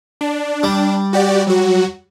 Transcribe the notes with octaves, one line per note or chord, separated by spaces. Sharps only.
D4
G3
F#4 G4 D5
F#3 F#4